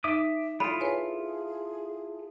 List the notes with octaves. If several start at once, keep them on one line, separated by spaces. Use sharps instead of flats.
D#4 E5 D6 D#6
E4 F4 A4 B5 D#6
G#4 B4 C#5 G#5